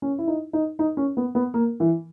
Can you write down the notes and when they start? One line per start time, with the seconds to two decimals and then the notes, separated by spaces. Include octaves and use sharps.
0.02 C#4
0.18 E4
0.27 D#4
0.53 D#4
0.79 D#4
0.97 C#4
1.17 B3
1.35 B3
1.54 A#3
1.80 E3